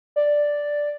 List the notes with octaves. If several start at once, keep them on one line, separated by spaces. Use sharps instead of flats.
D5